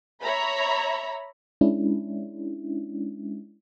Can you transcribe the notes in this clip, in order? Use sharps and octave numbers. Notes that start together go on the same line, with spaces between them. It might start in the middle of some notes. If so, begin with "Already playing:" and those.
C#5 E5 A#5 B5
G#3 C#4 D4 E4